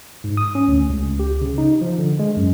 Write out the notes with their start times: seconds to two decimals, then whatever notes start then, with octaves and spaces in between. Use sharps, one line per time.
0.24 G#2
0.37 D#6
0.55 C#4
0.68 D2
0.90 C#2
1.19 G4
1.41 C#3
1.58 D#4
1.81 F3
1.99 D3
2.19 G#3
2.37 F#2